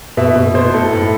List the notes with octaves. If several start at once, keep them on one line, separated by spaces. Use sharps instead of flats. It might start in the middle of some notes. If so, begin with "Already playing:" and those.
B2 E5
B2
B2 C5
A2 A4
A2 A4